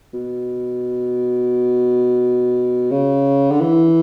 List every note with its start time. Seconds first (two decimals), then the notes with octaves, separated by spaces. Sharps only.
0.13 B2
2.91 C#3
3.51 D3
3.60 E3